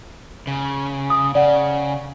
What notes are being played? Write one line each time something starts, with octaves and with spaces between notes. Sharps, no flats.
C#3
D#6
C#3 D5 F#5